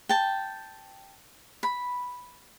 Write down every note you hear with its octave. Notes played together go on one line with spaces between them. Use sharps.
G5 A5
B5